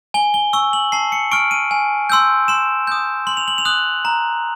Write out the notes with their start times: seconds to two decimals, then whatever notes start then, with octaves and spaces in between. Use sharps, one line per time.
0.14 G#5 G7
0.34 G7
0.53 C#6 E6 G7
0.73 F#7
0.92 A5 C7
1.12 C#7
1.31 C#6 F6 D7
1.51 D#7
1.71 G#5
2.10 C6 E6 G6
2.48 C6 E7
2.87 D#6 G6
3.27 C6 F#7
3.37 F7
3.48 F#7
3.58 F7
3.65 D#6 F#6 F#7
4.05 A#5